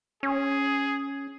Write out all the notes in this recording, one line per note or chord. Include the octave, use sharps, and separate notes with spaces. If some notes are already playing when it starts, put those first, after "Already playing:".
C#4 G#4